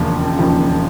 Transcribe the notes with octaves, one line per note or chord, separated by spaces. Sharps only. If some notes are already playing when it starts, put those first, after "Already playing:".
Already playing: E1 D#2 C#3 F3
E1 D#2 C#3 F3